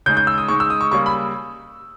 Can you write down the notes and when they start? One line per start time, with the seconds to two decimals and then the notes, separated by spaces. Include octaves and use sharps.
0.06 C#3 G6
0.09 G#3 D#4
0.17 G6
0.27 E6
0.38 D#6
0.48 C#3 G#3 D#4 C#6
0.60 E6
0.70 D#6
0.81 C#6
0.91 C#3 G3 A#3 C#4 C#6
1.06 B5